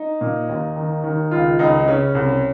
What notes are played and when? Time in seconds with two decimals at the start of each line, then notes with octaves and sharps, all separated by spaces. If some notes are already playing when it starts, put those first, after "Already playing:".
Already playing: D#4
0.21 A#2
0.49 D#2
0.76 D#3
1.04 D#3
1.31 C#2 F4
1.59 C#2 D#4
1.79 D#4
1.87 C#3 C#4
2.15 C2